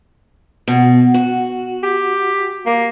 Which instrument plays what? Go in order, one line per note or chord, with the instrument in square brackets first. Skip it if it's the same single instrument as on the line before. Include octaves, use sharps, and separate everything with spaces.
[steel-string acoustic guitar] B2
F#4
[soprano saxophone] G4
A#3